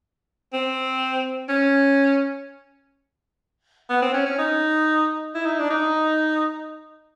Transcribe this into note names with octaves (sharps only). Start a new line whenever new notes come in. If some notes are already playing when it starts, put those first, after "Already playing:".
C4
C#4
B3
C4
C#4
C#4
D#4
E4
D#4
D4
D#4